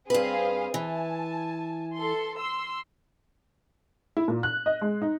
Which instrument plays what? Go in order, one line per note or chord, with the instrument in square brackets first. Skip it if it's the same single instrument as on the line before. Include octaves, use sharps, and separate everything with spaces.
[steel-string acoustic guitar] G2 B4 [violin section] C4 G#4 F5
[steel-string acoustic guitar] E3 [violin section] G#5 A5
[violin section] A4 C6
C6 E6
[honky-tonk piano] E4
A#2
F#6
D#5
G#3
D#4